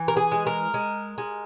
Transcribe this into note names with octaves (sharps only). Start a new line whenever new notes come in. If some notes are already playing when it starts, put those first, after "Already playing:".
Already playing: E3
A#4
G#4
G#3
A#4
G#3
G#3